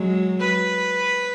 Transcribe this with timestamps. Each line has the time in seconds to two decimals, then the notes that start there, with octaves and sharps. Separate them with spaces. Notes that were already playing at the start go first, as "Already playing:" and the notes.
Already playing: F#3 G#3
0.40 B4